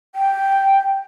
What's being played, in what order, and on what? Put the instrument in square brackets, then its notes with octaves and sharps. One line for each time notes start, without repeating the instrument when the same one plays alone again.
[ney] G5